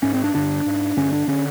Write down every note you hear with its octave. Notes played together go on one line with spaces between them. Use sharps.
G#2 C#4
C4
D4
G2 D3 D4
G#2
G2 D3 C#4
D4
D3 C#4